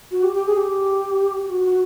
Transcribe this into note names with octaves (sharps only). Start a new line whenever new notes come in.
F#4
G4
G4
G#4
G4
F#4
F#4